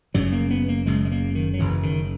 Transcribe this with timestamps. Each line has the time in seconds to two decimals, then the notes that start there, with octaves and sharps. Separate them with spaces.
0.14 F#1 F#2 C#3 F#3
0.32 A#3
0.50 B3
0.68 A#3
0.86 F#1 F#2 C#3 G#3
1.05 G#3
1.11 A#3
1.35 D#3
1.54 F#3
1.59 F#1 F#2 C#3 E3
1.83 D#3